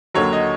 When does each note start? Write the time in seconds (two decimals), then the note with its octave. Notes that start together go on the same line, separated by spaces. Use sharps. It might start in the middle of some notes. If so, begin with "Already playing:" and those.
0.15 D#2 D3 F#3 C#5
0.33 D#5